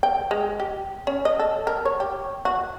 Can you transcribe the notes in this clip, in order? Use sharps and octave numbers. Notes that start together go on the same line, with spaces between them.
G5
G#3
G4
C#4
D#5
A4
A#4
C#5
G4
F#4